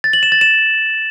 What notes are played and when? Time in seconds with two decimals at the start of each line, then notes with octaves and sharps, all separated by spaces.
0.04 A6
0.13 F#7
0.23 E7
0.32 A6
0.41 E7